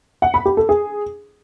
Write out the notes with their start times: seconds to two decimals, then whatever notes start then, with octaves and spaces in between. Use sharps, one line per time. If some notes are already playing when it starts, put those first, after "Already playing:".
0.22 F#5
0.34 B5
0.46 G4
0.57 A4
0.69 G#4